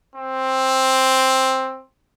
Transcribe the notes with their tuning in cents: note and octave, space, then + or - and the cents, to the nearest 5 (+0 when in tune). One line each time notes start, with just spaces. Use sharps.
C4 +10